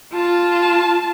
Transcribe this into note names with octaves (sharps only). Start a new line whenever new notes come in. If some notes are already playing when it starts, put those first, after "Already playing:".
F4 A5